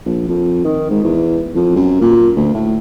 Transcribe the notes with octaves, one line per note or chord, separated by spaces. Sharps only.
A#1
F2
D#3
G#2
E2
F2
F#2
A#2
D2
A2